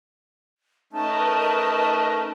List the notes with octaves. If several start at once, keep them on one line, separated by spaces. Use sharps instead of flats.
A3 C#4 D#4 A#4 B4 D#5 A5